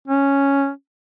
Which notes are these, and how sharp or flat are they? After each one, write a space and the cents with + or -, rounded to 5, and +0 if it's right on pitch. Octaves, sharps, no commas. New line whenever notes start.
C#4 +0